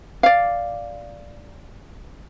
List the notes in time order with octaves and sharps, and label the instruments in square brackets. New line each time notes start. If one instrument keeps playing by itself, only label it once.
[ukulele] D5 F5